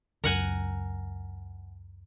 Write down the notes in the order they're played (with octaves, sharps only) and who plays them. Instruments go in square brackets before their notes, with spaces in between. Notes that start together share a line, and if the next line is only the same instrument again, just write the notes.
[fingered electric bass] C#2 F#2 [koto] A#4 F#5 G#5